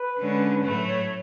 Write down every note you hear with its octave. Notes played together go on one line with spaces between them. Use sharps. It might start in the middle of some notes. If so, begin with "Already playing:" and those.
Already playing: B4
D3 G#3 C#4
A2 F#3 A3 B4
C#5